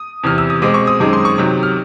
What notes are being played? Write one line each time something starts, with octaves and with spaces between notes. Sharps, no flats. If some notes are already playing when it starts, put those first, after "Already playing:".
Already playing: D#6
E2 C3 E3 F6
E6
D#6
B2 G#3 C4 D6
C#6
D#6
F#2 D#3 G#3 C4 D6
C6
C#6
C3 D#3 F#3
F6